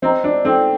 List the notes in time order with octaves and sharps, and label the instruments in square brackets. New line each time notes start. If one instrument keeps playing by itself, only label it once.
[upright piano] C4 [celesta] C5 D#5 A#5
[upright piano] D4
[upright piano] C4 [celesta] D#4 A4 D5 G5